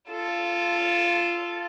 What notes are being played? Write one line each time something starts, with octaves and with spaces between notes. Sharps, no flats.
F4 A4